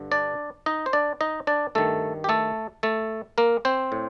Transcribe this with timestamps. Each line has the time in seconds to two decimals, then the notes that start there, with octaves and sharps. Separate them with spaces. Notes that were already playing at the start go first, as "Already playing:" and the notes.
Already playing: G2 D3
0.12 D4 D5
0.66 D#4 D#5
0.86 C5
0.93 D4 D5
1.21 D#4 D#5
1.47 D4 D5
1.75 G2 D#3 A3 A4
2.24 G4
2.29 A3 A4
2.83 A3 A4
3.38 A#3 A#4
3.65 C4 C5
3.92 A2